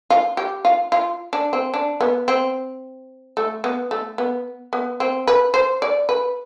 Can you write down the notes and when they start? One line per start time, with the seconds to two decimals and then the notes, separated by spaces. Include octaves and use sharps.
0.10 F4
0.37 G4
0.65 F4
0.92 F4
1.33 D4
1.53 C4
1.74 D4
2.01 B3
2.28 C4
3.37 A3
3.64 B3
3.91 A3
4.18 B3
4.73 B3
5.00 C4
5.27 B4
5.54 C5
5.82 D5
6.09 B4